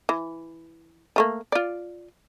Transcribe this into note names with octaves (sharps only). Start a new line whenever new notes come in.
E3
F3 A3 A#3
F4 D5